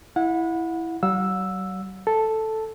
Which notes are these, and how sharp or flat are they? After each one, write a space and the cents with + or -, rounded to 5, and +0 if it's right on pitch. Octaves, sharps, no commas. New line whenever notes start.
E4 +0 F#5 -30
F#3 +45 F#5 -45 E6 +0
A4 +0 A5 +0